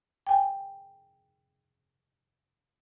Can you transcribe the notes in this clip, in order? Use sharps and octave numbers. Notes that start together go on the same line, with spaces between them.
G5 G#5